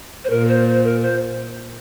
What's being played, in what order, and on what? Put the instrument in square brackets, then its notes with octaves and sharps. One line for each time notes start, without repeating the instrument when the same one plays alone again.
[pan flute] C5
[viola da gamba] A#2 [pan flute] A#4
[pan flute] C5
C5
A#4
C5